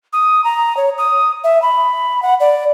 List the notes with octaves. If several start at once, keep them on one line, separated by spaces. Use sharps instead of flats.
D#6
A#5
C#5
D#6
E5
B5
F#5
D5